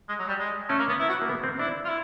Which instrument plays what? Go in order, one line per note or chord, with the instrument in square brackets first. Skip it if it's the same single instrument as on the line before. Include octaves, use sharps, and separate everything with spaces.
[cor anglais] G#3
F#3
G3
G#3
[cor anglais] A3 [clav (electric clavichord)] C#4
[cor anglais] A#3
B3
E4
F#4
[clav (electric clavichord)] A#3
B3
C4
[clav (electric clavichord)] D4 [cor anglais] E4
[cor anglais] F4
E4